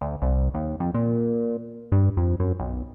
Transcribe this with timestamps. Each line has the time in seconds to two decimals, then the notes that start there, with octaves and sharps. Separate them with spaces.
0.01 D2
0.22 C2
0.54 D#2
0.80 F2
0.94 A#2
1.92 G2
2.17 F2
2.40 F#2
2.60 B1